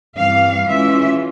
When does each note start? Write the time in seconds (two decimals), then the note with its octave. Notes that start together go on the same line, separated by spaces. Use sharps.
0.16 G2 E3 G3 C4 F5
0.68 E3 G#3 C#4 F4 E5